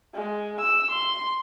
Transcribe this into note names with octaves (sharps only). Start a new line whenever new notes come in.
G#3
E6
C6